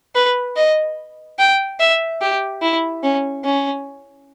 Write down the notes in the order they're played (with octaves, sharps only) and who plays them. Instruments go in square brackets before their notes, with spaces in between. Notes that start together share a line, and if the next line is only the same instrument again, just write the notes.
[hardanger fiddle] B4
D#5
G5
E5
G4
E4
C#4
C#4